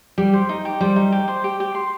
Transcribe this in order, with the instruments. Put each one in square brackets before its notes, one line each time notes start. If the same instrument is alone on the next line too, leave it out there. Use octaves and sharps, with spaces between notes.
[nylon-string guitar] G3 [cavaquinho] G4
[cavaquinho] C5
D#4
G4
[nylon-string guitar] G3 [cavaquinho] C5
[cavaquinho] D#4
G4
C5
G4
G4
C6